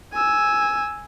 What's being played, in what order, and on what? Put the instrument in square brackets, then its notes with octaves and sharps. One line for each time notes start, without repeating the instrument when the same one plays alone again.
[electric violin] G#5 E6